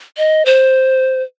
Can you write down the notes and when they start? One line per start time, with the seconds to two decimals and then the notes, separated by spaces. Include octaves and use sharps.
0.18 D#5
0.46 C5